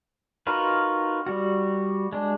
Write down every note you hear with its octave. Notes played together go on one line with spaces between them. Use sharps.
D#4 F4 F#4 A#4 B4
G3 F#4
G#3 D4